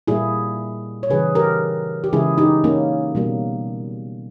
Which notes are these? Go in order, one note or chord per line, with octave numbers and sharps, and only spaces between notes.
A#2 G3 A#3 E4 G#4
C#5
C#3 E3 G3 G#4 B4
G4 A#4
G4
C#3 E3 G#3 E4 G#4
D#4 G4
A#3 C#4
B2 G3 A#3